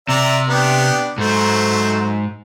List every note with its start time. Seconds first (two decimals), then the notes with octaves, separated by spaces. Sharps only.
0.08 C3 D5 E5 A#5
0.48 B3 D4 G4
1.18 G#2 F#3 A3 C5